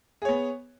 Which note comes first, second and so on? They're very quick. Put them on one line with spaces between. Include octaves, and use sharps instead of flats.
G#4 C#5 B3